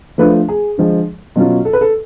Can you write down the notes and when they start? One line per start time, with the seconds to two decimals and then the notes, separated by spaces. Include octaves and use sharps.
0.18 F3 A3 D4 F4 B4
0.49 G#4
0.78 D3 F3 G#3
1.36 B2 F#3 C#4 F4
1.65 A4
1.73 B4
1.81 A4